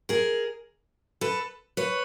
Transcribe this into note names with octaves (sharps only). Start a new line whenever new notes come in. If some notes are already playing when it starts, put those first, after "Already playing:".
G#4 A#4
A4 B4
B4 C#5